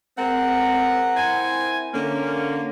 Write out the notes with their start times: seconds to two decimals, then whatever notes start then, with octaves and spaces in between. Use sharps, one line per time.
0.18 G#3 C4 A#4 F#5
1.16 C4 E4 G#5
1.94 D3 A#3 C#4